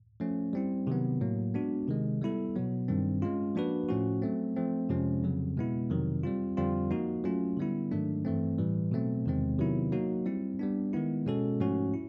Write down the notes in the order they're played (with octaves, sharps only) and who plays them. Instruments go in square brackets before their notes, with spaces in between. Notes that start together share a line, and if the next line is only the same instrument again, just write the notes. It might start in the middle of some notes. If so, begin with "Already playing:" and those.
[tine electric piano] F3 A3 C#4
G3 C4 E4
C3 D#3 F#3 B3
A2 F#3 A#3
G#3 B3 D4 F#4
C3 D#3 G#3
G3 B3 E4 A4
B2 F#3 B3
G2 D#3 G3 C4
G#3 C#4 F4
F3 A#3 D4 F#4 B4
A2 F3 A3 C#4 F#4
F#3 A3 C4
F3 A3 C4
F2 C3 F3 G#3 C#4
F2 C#3 F#3
B2 G#3 B3 E4
F2 C3 D#3 F#3
G3 C4 F4
F2 D3 G3 C4 F4
F3 A#3 D#4 F#4
F#3 A3 C#4 F4
D3 G3 B3 E4
G#2 D#3 F#3 A3 D4
G2 E3 A3 C4
A2 E3 G3
B2 F#3 A3 C4
E2 C3 D#3 G#3 C4
C3 D#3 F#3 B3 E4
F#3 A#3 D#4 F#4
G3 C4 E4
G3 B3 D4
D#3 G#3 B3 E4
B2 G#3 C#4 F#4 A4
G#2 F3 A3 C#4 F#4
E4